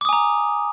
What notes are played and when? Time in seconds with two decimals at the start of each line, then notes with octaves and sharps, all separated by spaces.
0.01 D6
0.05 D#6
0.09 G#5
0.13 A#5